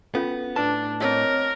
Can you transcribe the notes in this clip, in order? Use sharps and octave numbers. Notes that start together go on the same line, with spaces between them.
B3 C#4 F4 A4
A2 D4 B4 A5
C4 A#4 C#5 D#5